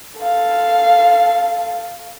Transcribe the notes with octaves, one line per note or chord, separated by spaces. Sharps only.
A4 F5